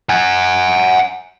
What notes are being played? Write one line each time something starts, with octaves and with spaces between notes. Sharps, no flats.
F#5 G#5